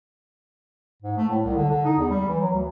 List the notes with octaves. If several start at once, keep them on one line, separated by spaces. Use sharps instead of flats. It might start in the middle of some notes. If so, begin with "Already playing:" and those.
G#2
A3
A2
C2
D3
D3
D#4
E2
G3
E3
F#3
D2